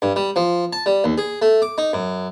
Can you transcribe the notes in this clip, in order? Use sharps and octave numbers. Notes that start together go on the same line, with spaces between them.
G2
G3
F3
A5
G3
D#2
G#4
A3
D6
D#4
F#2